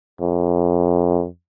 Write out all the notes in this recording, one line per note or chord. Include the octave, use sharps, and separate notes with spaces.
F2